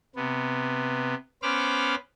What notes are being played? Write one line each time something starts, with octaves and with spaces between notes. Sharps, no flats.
C3 B3
B3 C#4 C5 B5 D6 F6